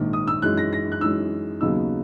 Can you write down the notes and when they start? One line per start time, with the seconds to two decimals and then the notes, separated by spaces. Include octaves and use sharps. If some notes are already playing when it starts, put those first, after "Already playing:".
Already playing: A#1 G#2 D#3
0.13 D#6
0.27 E6
0.42 F#2 E3 G#3 D#4 F#6
0.57 A#6
0.73 A#6
0.92 F#6
1.01 F#2 E3 G#3 D#4 E6
1.61 D#2 C#3 F#3 B3 D#4 E6